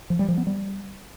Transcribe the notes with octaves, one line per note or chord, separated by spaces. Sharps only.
F3
G3
F3
B3
G3